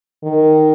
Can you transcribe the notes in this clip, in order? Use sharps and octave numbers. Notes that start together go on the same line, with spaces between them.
D#3